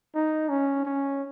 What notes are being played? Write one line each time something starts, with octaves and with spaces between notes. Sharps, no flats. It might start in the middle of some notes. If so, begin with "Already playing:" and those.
D#4
C#4
C#4